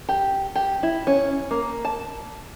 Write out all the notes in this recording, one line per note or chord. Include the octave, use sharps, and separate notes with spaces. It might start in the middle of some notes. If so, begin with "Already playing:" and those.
G4
G4
E4
C#4
A#3
A5